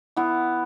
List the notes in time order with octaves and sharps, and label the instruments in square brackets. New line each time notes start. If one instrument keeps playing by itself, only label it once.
[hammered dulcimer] E3 B3 E4